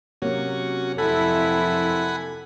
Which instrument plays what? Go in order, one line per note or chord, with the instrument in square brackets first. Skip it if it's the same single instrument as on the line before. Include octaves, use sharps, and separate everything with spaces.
[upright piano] C3 F#3 A#3 [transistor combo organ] C#4 F#4
[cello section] F2 C4 E4 [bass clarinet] A4 [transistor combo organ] F#5 G#5 B5